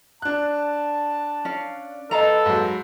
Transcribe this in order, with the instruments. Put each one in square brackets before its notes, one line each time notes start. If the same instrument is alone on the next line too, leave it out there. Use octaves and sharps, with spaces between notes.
[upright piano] D4 F#6 [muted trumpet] A5
[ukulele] C#4 D5 F5
[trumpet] A4 [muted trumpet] B4 [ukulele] D#5 F5 A#5
[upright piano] G#2 F#3